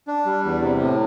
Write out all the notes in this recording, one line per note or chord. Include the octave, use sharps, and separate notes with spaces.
D4
G3
E2
C3
A2